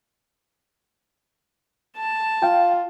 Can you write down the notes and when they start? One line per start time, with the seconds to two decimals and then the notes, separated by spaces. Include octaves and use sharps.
1.97 A5
2.42 F4 F5 G5